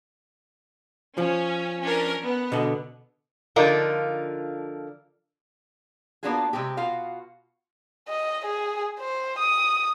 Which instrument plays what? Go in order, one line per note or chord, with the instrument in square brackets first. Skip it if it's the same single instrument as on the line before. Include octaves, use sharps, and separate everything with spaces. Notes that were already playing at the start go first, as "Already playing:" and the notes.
[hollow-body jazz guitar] F3 [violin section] C#4
[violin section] C#4 D4 A#4
B3
[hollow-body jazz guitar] B2 D3 D#5
[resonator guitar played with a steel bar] D3 F3 D4 D#4 F4 A#4
A#3 B3 D4 F4 F#4 G#4
C3 G#3 C4 G4
B2 F4 F#4 F5
[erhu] D#5
G#4
C5
D#6